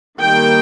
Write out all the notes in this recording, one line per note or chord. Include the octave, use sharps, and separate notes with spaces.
D#3 G3 A#3 G5